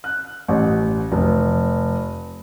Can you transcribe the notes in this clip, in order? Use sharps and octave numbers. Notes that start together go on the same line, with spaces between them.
F#6
A1
F1